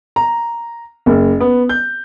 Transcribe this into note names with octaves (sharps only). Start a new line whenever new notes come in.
A#5
F#1
B3
G6